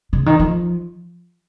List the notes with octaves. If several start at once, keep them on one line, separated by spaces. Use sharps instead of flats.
C#3
D#3
F3